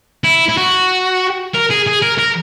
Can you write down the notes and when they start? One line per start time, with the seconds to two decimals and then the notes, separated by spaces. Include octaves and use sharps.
0.24 E4
0.48 E4
0.58 F#4
1.54 A#4
1.70 G#4
1.87 G#4
2.02 A#4
2.18 A#4